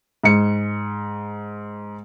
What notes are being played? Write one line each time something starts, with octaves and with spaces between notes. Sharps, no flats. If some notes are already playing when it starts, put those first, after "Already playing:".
G#2 C#7